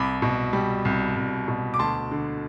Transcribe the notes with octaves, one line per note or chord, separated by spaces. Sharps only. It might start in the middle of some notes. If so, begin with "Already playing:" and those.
Already playing: C2 B5 D6
B2
G3
C2
C2
B2
D6
D2 A5 C6
D3